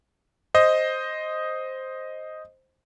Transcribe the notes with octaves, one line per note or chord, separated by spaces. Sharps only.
C5 D#5